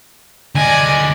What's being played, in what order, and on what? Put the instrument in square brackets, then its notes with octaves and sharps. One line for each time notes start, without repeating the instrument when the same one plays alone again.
[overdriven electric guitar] D2 D#5 [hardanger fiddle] D5 G#5